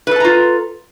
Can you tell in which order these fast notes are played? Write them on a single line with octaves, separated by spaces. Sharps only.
B4 A4 A5 A#5 F4